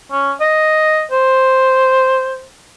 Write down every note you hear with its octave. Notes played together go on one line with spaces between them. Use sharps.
C#4
D#5
C5